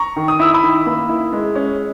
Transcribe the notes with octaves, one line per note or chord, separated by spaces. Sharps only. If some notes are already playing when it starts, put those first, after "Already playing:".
Already playing: A#5 C#6
D#3
D#6
E4 E6
B5 D#6
D#3
A#3
E4
G#3
C#4